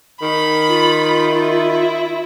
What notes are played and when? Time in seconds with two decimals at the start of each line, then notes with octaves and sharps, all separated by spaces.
0.22 D#3 B5
0.67 F4
1.31 E4